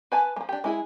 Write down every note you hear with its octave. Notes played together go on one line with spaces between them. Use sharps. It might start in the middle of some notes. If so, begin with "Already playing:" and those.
B4 G#5 A5
F3 G#3
D4 G4
G#3 E4 G#4